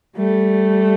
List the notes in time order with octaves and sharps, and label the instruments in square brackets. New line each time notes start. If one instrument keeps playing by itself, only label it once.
[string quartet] G3 A3